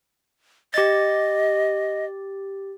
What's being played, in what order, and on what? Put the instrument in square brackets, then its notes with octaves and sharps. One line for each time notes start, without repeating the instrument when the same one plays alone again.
[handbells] G4 A6 [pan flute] D#5